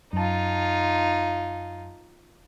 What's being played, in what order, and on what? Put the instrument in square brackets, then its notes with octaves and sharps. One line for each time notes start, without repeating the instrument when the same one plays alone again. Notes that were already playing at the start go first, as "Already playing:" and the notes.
[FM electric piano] F#2 A5 [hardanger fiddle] D#4 F4